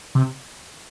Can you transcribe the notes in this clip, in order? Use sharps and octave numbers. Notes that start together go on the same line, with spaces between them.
C3